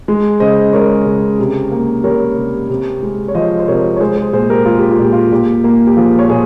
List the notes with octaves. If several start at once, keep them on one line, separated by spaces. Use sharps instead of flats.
G#3
C#3 C5 D#5
G#3 A#4 C#5
C#3
C3
A#3
G3 A#4 C#5
C3
C3
G#3
C#5
F3 C5 D#5
C5
C3 A#4 C#5
C#5
G#3 G#4 C5
G#4 C5
A#2 G#4 C5
G4 A#4
G#3 F4
G4
F4
A#2 G4
F4
A#2 G4
A#3
G4
F3 F4 G#4
C#5
A#2 G#4 C5